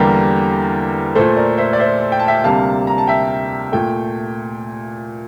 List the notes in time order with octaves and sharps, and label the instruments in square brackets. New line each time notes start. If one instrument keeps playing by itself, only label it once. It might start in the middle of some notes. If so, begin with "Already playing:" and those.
Already playing: [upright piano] E2 D3 G3 A#3 G4 A#4
A#2 A3 A4 C5
A#4 D5
C5 E5
D5
C5 E5
G5
A5
E5 G5
D2 C3 G3 A#3 F5 A5
A#5
A5
E5 G5
A#2 A3 G5